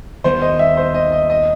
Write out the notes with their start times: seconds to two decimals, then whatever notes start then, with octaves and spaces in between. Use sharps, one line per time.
0.24 D#2 D#3 G3 B3 C5
0.42 D#5
0.59 E5
0.77 C5
0.94 D#5
1.12 D#5
1.30 D#5